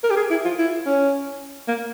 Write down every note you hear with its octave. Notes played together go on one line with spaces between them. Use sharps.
A#4
G4
G#4
E4
F4
E4
C#4
A#3